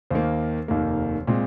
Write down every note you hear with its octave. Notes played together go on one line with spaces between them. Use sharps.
D#2 D#3 A#3 C5
F1 D#2 D#3 A#3
A#2 G#3 C4